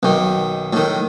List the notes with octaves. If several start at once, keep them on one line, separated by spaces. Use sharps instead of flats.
B1 D#3
A2 D#3